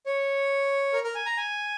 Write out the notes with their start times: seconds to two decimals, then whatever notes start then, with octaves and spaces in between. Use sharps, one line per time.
0.06 C#5
0.93 A#4
1.04 A#4
1.15 G#5
1.26 A#5
1.37 G#5